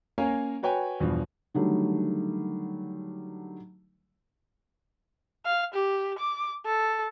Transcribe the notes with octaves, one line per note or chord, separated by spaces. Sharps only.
A#3 C#4 A#4 C#5 F5 G#5
F#4 B4 C#5 G5 G#5
E2 G2 B2 F3
D3 D#3 F#3 G3 A3
F5
G4
D6
A4